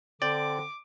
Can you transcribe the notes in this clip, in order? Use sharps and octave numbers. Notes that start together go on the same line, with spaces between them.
D3 C4 D5 G5 D6